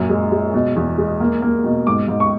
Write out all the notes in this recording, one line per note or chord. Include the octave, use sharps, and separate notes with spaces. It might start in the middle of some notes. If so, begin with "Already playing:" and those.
Already playing: F#2 A#2
G#3
G#3
B2
E2
G#3
A#3
A#3
B2
G#2 D6
G#2
C#6